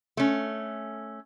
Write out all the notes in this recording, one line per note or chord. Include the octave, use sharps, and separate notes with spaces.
A3 C#4